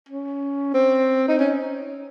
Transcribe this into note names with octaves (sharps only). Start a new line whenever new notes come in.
C#4
C4
D#4
C#4